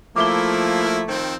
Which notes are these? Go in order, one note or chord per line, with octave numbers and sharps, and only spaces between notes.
F3 A3 A#3 E4 D6 G7
D#3 F3 C4